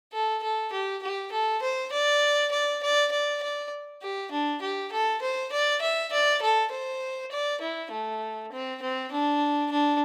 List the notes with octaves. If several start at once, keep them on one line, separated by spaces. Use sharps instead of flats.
A4
A4
G4
G4
A4
C5
D5
D5
D5
D5
D5
G4
D4
G4
A4
C5
D5
E5
D5
A4
C5
D5
E4
A3
C4
C4
D4
D4